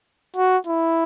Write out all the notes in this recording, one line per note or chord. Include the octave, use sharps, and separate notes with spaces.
F#4
E4